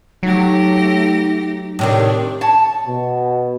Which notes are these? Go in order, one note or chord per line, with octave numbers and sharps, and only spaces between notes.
F#3 A3 D#4 G4 A#6
A2 C3 D#3 D4 C#5
C#5 A5
B2